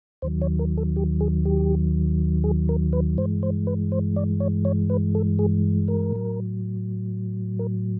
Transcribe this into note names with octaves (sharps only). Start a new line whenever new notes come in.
D#2 D#3 F#3 C5
C#5
A#4
A4
G4
G#4
G4
G#4
A#4
B4
G2 E3 G#3 C5
C5
B4
C5
D5
C#5
C#5
B4
A4
G#4
A#4
A2 F#3
A#4